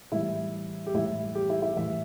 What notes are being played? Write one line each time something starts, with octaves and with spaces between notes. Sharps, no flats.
A2 E3 G3 E4
G4
A2 E3 G3 E4
G4
E4
E4
A2 E3 G3 E5